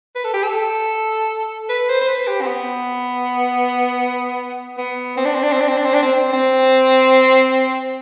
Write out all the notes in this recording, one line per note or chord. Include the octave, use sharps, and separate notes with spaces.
B4
A4
G4
A4
B4
C5
C5
B4
G4
C4
B3
B3
C4
D4
C4
D4
C4
D4
C4
D4
C4
D4
C4
C4